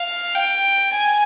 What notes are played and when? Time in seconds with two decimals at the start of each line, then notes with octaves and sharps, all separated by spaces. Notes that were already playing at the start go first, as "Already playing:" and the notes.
Already playing: F5
0.35 G5
0.93 G#5